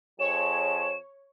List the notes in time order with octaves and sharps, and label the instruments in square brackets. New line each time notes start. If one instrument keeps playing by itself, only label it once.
[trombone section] F2 F3 G#4 [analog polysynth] C#5 [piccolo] E7